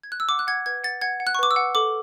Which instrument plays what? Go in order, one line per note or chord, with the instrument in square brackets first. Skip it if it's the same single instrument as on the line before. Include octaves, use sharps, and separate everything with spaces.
[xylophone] G#6
F#6
E6
F#5 D6
F#6
F#5 G#6
B4 G#6
F#5 A6
F#5 G#6
F#5
F#6
C#6
B4 D6
E6
F#5
A4 D6